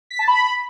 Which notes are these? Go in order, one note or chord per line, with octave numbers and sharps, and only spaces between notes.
B6
A5
B5